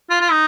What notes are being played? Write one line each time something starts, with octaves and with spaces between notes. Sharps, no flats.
F4
F4
D#4